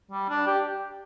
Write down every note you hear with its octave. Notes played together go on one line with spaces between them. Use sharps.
G3
D4
G4